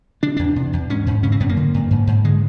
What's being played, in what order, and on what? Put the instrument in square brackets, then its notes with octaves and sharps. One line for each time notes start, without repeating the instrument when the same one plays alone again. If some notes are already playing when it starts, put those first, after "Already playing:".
[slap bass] C#3 D4
E2 D4
C3
E2
G#2 C#4
G#2
C#3 C#4
C4
F#2 B3
A#3
D3
G2
G#2
G#2
D3 G#3